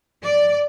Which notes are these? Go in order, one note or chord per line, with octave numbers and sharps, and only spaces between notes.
D5